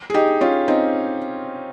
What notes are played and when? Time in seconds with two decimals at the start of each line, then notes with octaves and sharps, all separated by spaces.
0.10 G#4
0.14 D#4 G4
0.41 C#4 F4
0.68 C4 D#4